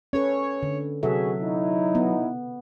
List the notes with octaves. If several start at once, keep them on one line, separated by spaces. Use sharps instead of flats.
C#4 A4 B4 C#5
D3
C3 F#3 B3 F#4 G#4 A4 E5
D#4 E4
B3